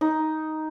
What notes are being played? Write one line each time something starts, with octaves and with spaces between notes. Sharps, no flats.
D#4